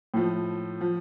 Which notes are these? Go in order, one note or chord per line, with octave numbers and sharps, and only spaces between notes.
A2 F3
F3